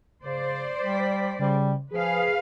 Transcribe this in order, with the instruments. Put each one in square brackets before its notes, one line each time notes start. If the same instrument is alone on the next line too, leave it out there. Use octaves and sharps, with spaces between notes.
[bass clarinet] C#3 [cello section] C5 D5
[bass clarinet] G3 [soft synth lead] B6
[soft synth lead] C#3 [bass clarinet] G3
[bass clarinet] F3 [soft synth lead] G#4 [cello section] B4 F5